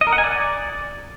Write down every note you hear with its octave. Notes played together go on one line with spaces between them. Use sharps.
D#5
A#4
F#5
G#5
D5